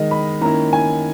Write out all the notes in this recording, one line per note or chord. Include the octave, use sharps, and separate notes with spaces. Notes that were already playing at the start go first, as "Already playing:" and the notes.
Already playing: D#3 G#3 D#4 D#5
B5
D#3 A#3 C#4 E4 A#5
G#5